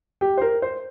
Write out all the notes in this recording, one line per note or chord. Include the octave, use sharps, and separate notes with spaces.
G4
C5
A#4
C5